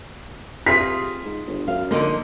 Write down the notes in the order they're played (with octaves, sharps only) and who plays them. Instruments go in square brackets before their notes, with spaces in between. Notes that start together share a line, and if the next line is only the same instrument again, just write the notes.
[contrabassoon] C3 [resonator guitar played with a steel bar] F4 G#4 [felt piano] B6
[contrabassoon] G#2
G1
[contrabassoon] F#2 [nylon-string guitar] F5
[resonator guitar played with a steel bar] D3 F3 D#4 [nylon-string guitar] A#3